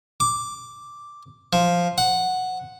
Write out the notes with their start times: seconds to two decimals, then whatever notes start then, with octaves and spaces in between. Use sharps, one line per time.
0.20 D6
1.53 F3
1.98 F#5